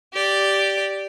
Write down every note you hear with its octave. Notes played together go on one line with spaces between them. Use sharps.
G4 D5